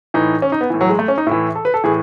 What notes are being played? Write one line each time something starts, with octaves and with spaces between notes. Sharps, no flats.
A2 E3 D#4
C#4
D#4
B3
A2 E3
F#3
G#3
A3
C#4
D#4
A2 E3 E4
A4
B4
A4
A2 E3 G#4